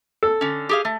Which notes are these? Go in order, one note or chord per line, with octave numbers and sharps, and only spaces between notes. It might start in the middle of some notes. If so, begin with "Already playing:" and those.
A4
D3 C#4
G4 G#4 F5
A3